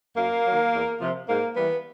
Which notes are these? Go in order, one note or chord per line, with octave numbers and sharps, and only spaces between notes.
F#2 A#3
D#3 F#3
E2
C3 F3
G#2 A#3
E3 G3 B3